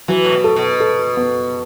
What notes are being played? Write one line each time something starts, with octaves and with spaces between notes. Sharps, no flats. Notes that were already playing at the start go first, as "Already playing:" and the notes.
E3 F#3
A2
B2
A4
B2
A4
B3